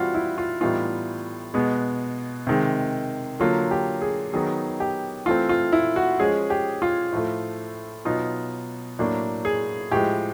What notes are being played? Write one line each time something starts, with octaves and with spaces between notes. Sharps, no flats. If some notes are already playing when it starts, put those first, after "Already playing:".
Already playing: E3 G3 C4 F4 F#4
E4
F4
A2 E3 G3 B3 D#4 F4
B2 G#3 B3
C3 D#3 G#3
D3 F#3 A#3 F4
G4
G#4
D#3 F#3 B3 D#4 G#4
G4
E3 A3 C4 F4
F4
E4
F#4
F3 G#3 C#4 G#4
G4
F4
A2 F3 A3
B2 F#3 B3 D#4 F4
A2 F#3 A#3 D4
G#4
A2 F3 G#3 G4